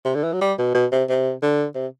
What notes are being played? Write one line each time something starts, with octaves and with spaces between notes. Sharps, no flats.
C3
D3
E3
F#3
G3
B2
B2
C3
C3
D3
C3